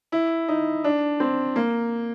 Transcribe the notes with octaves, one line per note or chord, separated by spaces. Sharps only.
E4
D#4
D4
C4
A#3